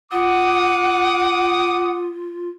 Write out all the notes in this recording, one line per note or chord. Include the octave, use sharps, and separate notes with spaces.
F4 F#5 D6 D#6